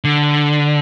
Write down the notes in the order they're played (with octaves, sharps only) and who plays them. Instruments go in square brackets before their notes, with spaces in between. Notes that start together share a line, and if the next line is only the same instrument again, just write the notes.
[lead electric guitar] D3